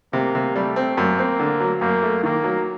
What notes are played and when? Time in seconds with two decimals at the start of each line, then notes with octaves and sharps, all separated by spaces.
0.13 C3 A#3
0.35 C3
0.56 G3 A3
0.76 C4
0.97 F#2 A#3
1.19 C4
1.39 D3
1.60 F#3
1.81 F#2 A#3
2.03 A3
2.23 D#3 A#3
2.44 F#3